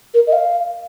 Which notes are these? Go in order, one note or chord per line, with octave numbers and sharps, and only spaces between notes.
A#4
D#5
F5